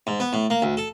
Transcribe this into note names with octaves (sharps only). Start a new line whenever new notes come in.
G#2
B3
A2
A#3
D2
A4